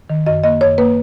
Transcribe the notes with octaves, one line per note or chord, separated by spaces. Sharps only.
D#3
F#2 D#5
A#3 D#5
F#2 C#5
A#3 B4